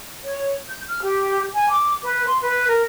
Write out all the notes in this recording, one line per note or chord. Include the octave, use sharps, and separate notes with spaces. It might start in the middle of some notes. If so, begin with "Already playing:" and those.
C#5
G6
F6
G4
G#5
D6
B4
C6
B4
A#4